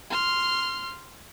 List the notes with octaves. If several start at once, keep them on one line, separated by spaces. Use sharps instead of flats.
C6 F6